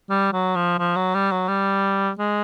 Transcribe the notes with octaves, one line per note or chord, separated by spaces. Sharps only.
G3
F#3
F3
F3
F#3
G3
F#3
G3
G#3